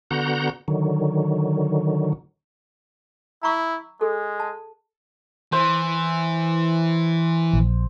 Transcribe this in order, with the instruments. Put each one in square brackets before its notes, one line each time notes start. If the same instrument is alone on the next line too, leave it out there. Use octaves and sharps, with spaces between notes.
[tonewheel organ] D3 B3 F#4 F#5 A#5 G6
D3 D#3 F#3
[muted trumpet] E4 [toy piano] A#5 C#6
[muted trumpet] G#3 [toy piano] G#4 A4
[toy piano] A5
[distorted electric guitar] E3 [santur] C5
[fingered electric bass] A#1